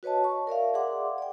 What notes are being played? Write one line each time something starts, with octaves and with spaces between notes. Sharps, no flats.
F#4 B4 C#5 D#5 A5
C#6
A#4 D5 E5 F5
G#4 D5 E5 F#5 C6 D6
D5 G5